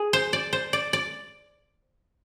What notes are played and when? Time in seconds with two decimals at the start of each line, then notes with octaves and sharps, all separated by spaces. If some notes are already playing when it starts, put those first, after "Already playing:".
Already playing: G#4
0.13 C5
0.33 D5
0.53 C5
0.73 D5
0.93 D5